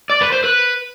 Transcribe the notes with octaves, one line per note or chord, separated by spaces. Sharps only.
D5
B4
C5
B4